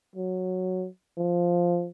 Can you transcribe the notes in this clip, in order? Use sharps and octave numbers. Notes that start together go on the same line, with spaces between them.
F#3
F3